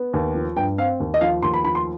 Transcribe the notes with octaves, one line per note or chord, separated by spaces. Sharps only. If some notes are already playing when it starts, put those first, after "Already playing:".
Already playing: B3
D#2
F3
G2 G5
C4 F5
D#2
D#5
F3 F5
D#2 C6
B5
F3 B5
C6